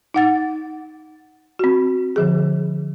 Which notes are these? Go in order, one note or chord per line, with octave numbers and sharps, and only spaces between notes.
D#4 F#5 A6
C4 F#4
D3 F3 G#4